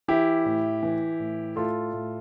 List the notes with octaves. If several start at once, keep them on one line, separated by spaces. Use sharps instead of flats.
E3 E4 G4
A2
E3
A2
A2 F4 A4
A2